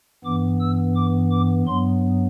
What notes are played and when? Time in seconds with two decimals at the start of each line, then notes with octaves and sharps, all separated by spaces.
0.24 G2 E3 B3 D6
0.60 E6
0.96 D6
1.31 D6
1.67 G2 F#3 B3 C6